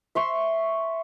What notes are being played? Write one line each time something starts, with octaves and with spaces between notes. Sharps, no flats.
E5 C6 C#6